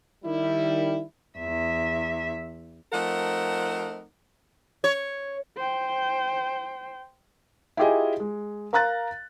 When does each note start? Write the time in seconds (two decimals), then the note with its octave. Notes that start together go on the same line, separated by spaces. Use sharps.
0.24 D#3 G3 E4
1.39 E2 E5
2.93 F3 A3 C4 D#4 A#4 F#5
4.84 C#5
5.57 C5 G5
7.77 E4 F4 G4 G#4 D#5 G#5
8.20 G#3
8.73 A#4 F5 A#5 F#6 A6